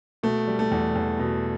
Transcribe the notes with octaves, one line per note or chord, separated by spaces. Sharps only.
B2 A3
G3
A3
E2
E2
B2